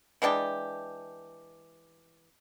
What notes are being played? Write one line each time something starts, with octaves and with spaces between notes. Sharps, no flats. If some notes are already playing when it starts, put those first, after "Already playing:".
E3 G#3 D4 G4